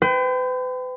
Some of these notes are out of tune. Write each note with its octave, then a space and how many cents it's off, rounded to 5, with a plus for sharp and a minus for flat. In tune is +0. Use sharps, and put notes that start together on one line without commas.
B4 +45 G5 +0